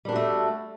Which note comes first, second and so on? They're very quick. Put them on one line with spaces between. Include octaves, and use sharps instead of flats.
G3 D4 F#4 A3